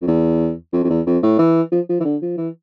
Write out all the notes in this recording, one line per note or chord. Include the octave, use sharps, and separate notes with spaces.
F2
E2
F2
F2
E2
F2
A2
E3
F3
F3
E3
D3
F3
E3